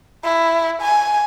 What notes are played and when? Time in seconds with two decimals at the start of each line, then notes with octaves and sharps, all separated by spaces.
0.24 E4
0.82 G#5